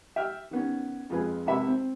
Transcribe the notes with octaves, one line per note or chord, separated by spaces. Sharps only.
E5 G5 F6
D#3 B3 C#4
F2 G#3 F4 G#4 B4 G#5
G#1 C3 A#4 B4 E5 B5
C4